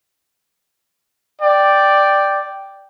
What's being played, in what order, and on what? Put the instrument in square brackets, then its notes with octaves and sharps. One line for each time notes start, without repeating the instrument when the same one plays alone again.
[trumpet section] D5 G5